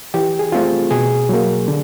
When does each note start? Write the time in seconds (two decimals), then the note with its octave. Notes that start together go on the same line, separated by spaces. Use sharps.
0.14 E3 G4
0.39 G#4
0.52 A3 C4 F4
0.91 B2 G#4
1.29 F#3 A#3
1.68 D3